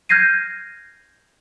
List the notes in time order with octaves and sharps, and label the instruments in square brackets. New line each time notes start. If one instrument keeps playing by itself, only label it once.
[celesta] F6 G6 G#6 A#6 C7 D#7